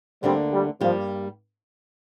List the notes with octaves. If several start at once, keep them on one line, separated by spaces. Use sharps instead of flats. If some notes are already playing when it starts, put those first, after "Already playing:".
D2 D3 G3 A#3 C4 D4
G3
G2 F3 G3 A#3 G4